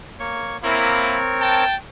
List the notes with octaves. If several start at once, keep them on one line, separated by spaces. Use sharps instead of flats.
A#3 C#5 C#6
A#3 C4 E4 A#4 C#5
G5 A5